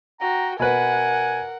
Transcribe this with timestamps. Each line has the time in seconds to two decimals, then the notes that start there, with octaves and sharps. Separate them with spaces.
0.21 F#4 G5 A#5
0.59 B2 A#4 B4 F#5 G#5